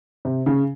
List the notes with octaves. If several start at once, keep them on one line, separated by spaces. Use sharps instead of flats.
C3
C#3